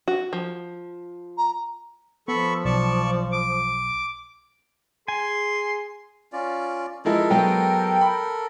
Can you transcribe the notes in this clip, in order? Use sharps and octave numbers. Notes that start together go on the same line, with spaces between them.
F#4
F3
A#5
F3 B3 A4 B5 C#6
B1 D5 A5 C#6
D6
G#4 G#5 C6
C#4 F4 D5
F3 G#3 E4 A4 A#4
F#3 G#3 B3 G5
B5